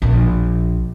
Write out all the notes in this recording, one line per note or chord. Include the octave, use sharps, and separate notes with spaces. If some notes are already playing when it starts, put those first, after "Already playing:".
A#1 A#3